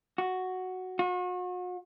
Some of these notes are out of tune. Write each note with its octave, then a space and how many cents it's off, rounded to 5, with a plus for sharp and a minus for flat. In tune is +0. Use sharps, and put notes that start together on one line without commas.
F#4 +0
F#4 -40